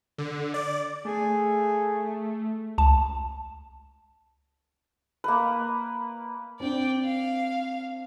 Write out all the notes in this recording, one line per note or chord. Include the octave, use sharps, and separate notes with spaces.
D3
D5
A3 G#4
C#2 A5
A#3 B4
C4 D4 D5 G5
F5